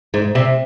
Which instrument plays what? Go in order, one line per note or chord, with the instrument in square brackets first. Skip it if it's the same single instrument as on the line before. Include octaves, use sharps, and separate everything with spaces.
[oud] G#2
C3